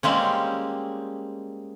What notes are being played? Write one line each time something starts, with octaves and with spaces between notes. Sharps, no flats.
G3 G#3 A#3 C4 C#4